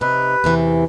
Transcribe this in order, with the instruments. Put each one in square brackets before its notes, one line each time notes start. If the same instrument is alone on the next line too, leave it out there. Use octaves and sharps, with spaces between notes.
[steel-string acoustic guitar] C3 D#4 [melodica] B4
[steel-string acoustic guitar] E2 C3 E3